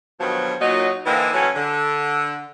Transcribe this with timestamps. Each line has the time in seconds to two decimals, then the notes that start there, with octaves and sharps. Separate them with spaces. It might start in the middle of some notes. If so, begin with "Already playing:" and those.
0.20 G2 B2 D#3 F3 F#3
0.60 A#2 F#3 D#4
1.06 D3 E3 A#3 C4 D#4 E4
1.33 A2 E3 F#3 C#4
1.55 D3